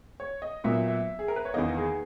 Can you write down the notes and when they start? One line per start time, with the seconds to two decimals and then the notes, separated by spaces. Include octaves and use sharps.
0.20 C#5
0.42 D#5
0.64 A#2 F#3 B3 E5
0.87 E5
1.19 G#4
1.28 A#4
1.36 B4
1.45 C#5
1.54 E2 D#3 A#3 D#5
1.77 G#4